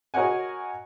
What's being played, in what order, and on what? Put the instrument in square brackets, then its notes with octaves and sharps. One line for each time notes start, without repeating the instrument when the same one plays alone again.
[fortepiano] F#4 A#4 C#5 D#5 F#5 G#5